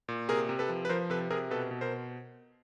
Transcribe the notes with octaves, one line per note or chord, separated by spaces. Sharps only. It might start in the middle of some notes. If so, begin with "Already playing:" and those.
A#2
C3 G#4 A#4
C3
A4 B4
F3
B4
F3 A#4 C5
C3 A4 B4
C3 G#4 A#4
B2 A4 B4
B2
A#4 C5